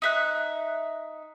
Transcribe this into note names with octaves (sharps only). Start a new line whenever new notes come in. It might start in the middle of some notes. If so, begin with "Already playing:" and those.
D#4 E5 F#6